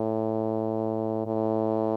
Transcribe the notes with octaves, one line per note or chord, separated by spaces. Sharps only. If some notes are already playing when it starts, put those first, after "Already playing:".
Already playing: A2
A2